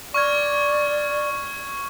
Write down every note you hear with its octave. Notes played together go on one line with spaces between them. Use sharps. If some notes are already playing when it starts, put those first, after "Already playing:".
D5 C#6 F6 G#6